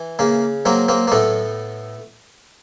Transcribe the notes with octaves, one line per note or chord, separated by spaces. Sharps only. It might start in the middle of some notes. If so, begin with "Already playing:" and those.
Already playing: E3
C#3 A#3
F#3 A#3 C4
A#3 C4
A#3
A2 A3 B3